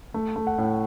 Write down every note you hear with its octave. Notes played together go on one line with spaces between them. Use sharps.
A3
A3
F#5
A2